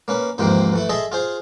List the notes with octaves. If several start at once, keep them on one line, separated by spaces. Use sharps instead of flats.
A#3 C#4 B4
D#2 G#2 E3 F3 A#3 C4
E3 A3 E4
G#4 A4 D#5 E5 C6
F4 G#4 C5